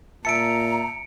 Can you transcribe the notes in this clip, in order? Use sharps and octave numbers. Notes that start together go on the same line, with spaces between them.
A#2 E5 A5 A#5 C#7 D7